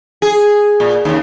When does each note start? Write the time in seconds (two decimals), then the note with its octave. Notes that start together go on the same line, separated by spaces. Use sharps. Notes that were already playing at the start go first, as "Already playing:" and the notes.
0.22 G#4
0.80 A#2
1.05 D#2 C#3